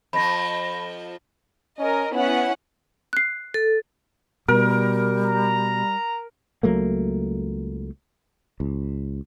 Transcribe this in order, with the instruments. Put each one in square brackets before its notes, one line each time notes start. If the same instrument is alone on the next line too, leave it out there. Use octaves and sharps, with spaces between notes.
[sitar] F2 F3 [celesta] B5 A#6
[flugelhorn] C#4 [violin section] A#4 D#5
[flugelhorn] B3 [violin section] C#4 E4 F#5
[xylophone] F#6 C7
[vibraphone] A4
[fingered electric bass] B2 [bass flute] G3 [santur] A#4
[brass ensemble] A#5
[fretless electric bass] C#2 F#3 A3 A#3
C#2